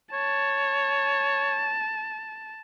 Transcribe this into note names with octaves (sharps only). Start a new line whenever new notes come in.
C#5 A5